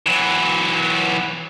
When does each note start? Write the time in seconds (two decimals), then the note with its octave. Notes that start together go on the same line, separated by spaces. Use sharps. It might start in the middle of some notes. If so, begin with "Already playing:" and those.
0.07 E3 F#3